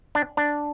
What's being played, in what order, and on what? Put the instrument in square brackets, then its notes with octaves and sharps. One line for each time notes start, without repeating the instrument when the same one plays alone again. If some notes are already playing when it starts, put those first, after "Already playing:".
[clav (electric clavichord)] D4
D4